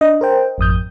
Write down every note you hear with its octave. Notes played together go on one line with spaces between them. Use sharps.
D4 D#5
A#4 C5 G5
G#1 F2 D#6 G6